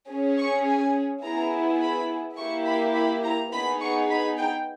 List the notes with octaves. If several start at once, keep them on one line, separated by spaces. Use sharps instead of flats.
C#4 G#4
C#6
G#5
B3 E4 G#4 A#5
B5
A#3 E4 G4 C#6
B5
B5
A#5
B3 D#4 G#4 B5
C#6
B5
G5